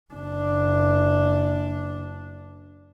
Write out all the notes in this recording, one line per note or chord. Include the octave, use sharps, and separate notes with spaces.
F#1 D4